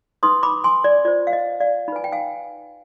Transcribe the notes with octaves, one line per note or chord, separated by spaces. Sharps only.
D#4 B4 C6 D#6
B5 D6
G#5 C6
D5
F4 C5 D5
F5
D#5
D5 F5
D#4 B4 G#5 B5
G5
F5 G#5